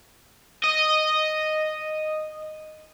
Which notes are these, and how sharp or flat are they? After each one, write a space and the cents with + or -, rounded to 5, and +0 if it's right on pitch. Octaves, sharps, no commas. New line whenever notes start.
D#5 -5